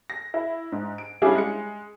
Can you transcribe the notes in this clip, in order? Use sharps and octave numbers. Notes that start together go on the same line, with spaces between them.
A#6
E4
G#2
D7
G3 C#4 D4 E4 G#4 F5
G#3 C#7